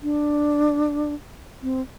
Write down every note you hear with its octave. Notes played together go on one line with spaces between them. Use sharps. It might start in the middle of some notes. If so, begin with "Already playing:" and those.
D4
C4